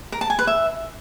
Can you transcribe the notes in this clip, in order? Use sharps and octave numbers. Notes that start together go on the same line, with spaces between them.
A#4
A5
G#5
B4
E5